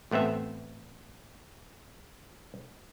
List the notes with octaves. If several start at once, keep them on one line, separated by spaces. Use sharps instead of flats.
A1 A3 B3 C4 E5